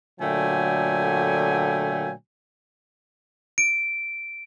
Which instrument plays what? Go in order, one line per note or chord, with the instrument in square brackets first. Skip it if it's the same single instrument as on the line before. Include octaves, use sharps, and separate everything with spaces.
[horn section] A#2 D3 F#3 A3 G5 G#5
[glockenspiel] D7